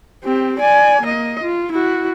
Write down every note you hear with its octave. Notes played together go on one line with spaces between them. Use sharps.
C4 G4
D5 G#5
A#3 D#5
F4
E4 F#4